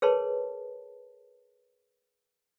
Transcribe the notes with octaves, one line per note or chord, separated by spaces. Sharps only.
G#4 A#4 B4 C#5 A5 C6